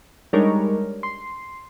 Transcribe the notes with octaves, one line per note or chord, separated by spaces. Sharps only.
G3 G#3 D4 D#4 A#4 C#5
C6